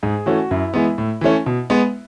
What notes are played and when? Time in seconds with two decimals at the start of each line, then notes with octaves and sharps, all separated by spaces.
0.03 G#2 G#4
0.26 E3 A3 C#4 F#4
0.51 F#2 E4
0.74 E3 G#3 B3
0.98 A2
1.21 E3 A3 C#4
1.46 B2
1.70 G#3 B3